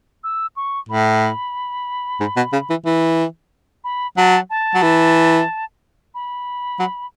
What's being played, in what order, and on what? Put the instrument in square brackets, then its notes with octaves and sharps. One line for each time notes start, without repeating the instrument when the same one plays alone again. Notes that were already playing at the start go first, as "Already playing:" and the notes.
[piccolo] E6
C#6
[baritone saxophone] A2 [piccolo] B5
[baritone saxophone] G#2
B2
C#3
E3
E3
[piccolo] B5
[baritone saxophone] F#3 [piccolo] A5
[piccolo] A5
[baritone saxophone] F#3
E3
[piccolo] B5
[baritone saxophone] F#3